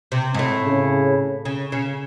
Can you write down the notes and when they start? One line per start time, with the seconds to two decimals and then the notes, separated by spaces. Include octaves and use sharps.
0.12 C3
0.34 G#2
0.39 A2
0.65 C#3
1.45 C#3
1.72 C#3